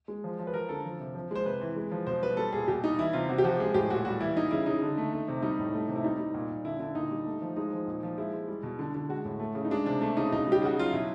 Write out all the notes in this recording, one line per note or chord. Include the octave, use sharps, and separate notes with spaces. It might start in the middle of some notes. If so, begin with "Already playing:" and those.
G#3
F3
F3
B4
F3 A#4
D3 A4
F3
C3
F3
G#3 C5
C3 B4
E3
G#3
F3
B2 C5
G3 B4
G3 A4
A#2 G#4
B2 G4
G3 D#4
E3 E4
C3 F4
C3 F#4
G4
F3 F#4
G#3 G#4
A2 G4
A#2 F#4
G3 F#4
E3 E4
G3 D#4
C#3 E4
C#3 D#4
D3
A3
A3
C3
G3 D#4
A2
A3
C3
E4
G3 D#4
G3
A#2
A#2
D3 E4
D3 E4
A#2 D#4
G3
A3
F3
G#3 D#4
F3
A#2
F3
G#3 E4
G#3
G3
B2
D3
D3
G#3 F#4
A2
A3
C#3
D#4
G#3 D4
C3 D4
A3 D4
C#3 D#4
B2 D#4
G3
G4
C#3 F#4
F#3 F4
B2 E4